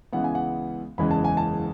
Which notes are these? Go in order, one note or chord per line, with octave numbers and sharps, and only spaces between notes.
C#2 C#3 E3 G#3 B3 F#5
G#5
F#5
F#1 E2 C#3 E3 G#3 B5
A5
G#5
A5